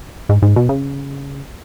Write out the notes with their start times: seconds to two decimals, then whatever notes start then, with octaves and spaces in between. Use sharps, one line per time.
0.29 G#2
0.42 G#2
0.56 B2
0.69 C#3